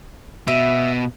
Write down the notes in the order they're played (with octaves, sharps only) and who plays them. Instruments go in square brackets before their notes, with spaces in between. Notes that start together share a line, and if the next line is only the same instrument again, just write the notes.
[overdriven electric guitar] B2 [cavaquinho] E5